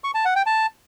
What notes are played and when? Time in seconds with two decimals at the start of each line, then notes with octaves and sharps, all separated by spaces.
0.04 C#6
0.15 A5
0.25 F#5
0.36 G5
0.46 A5